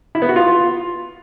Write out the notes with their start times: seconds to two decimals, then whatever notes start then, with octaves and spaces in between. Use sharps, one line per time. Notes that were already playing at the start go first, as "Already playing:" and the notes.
0.15 E4
0.22 B3
0.29 F#4
0.36 F4